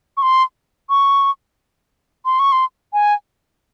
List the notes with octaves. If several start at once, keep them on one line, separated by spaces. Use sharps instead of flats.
C#6
C6
C#6
C6
C#6
C6
G#5